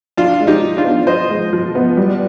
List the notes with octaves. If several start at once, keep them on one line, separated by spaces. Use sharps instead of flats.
F3 D4 F4
G#3
D#4 G4
F3
D4 F4
B3
F3 C5 D#5
G#3
F3
B3
G3